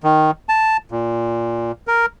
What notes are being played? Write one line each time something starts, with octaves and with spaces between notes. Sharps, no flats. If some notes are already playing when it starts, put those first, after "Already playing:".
D#3
A5
A#2
A#4